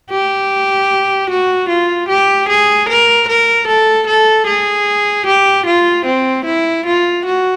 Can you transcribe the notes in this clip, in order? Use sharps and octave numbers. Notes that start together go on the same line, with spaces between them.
G4
F#4
F4
G4
G#4
A#4
A#4
A4
A4
G#4
G4
F4
C4
E4
F4
F#4